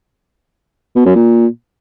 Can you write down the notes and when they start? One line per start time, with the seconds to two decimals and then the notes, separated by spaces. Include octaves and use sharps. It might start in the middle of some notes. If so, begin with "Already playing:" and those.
0.96 B2
1.06 F#2
1.15 A#2